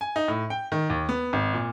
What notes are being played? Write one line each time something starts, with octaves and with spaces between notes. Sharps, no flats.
G#5
D#4
A2
G5
D#3
D#2
B3
G#1
A#2